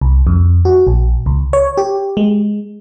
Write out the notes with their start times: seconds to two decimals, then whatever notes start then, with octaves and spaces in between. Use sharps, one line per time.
0.01 C2
0.27 F2
0.65 F#4
0.87 A#1
1.26 C#2
1.53 C#5
1.77 G4
2.17 G#3